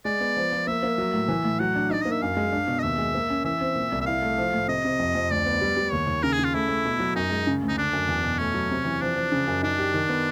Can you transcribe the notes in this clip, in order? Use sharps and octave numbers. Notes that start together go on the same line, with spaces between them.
G#3 D5
B3
F3
F3
A#3 E5
A#3
F#3
A2
E3
A2
F#3 F#5
D4
D#4 D5
A#3 D#5
E5
F#2 F5
G#3
D4
B2
D#5
D#2 E5
G#3
A#3
C#4
E3 E5
C4
A#2
C2
E5
E4 F5
A3
F3
A2
C3 D#5
C3
F2
F2
D2 D5
B3
G3
G3
D#2 C#5
D#2
C#3 A#4
G#4
C#3
F4
A3 E4
A3
B2
F#3
F#2 D#4
G#3
C#3
D2
D#4
D3 D4
F#2
E2
B2
A3 C#4
F#3
C3
E3
F3 D4
F3
C#3
F#2
D4 D#4
G4
D#3
B3